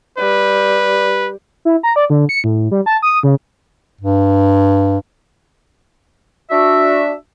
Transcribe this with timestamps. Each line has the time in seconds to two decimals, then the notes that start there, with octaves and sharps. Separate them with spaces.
0.19 G3 B4
1.65 E4
1.83 A#5
1.96 D5
2.10 D3
2.29 C#7
2.44 A2
2.71 G3
2.86 A5
3.02 D#6
3.23 C#3
4.01 G2
6.51 D4 F#4 E5